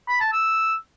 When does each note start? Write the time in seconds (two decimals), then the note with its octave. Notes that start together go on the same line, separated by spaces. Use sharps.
0.08 B5
0.20 A5
0.32 E6